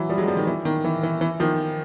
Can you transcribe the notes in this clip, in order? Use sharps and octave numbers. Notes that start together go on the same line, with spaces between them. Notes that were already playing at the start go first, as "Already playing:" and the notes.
Already playing: E3 F#3
F3 G3
F#3 G#3
F3 G3
D#3
E3
D#3
E3
E3
E3
D#3 F3